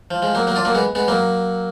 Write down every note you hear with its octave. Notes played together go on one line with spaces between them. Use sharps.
F3
F3 G#3
F#3 A#3
F#3 A#3
D4 F4
F#3 A#3
G#3 B3
G#3 B3
F#3 A#3